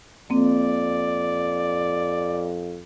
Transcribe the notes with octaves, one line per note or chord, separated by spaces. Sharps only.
F2 A#3 C4 D5